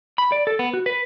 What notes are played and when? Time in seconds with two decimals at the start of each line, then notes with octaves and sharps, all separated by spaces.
0.18 B5
0.32 D5
0.47 A4
0.59 B3
0.74 F#4
0.86 B4